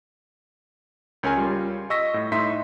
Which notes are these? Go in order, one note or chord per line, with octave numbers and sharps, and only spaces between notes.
C#2 C#4 A#4 G#5
G3 F4
D#5 C#6 E6 A#6 B6
A2
A2 D#4 E5 C6 B6